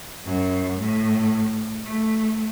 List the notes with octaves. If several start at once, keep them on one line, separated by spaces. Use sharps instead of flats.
F#2
A2
A3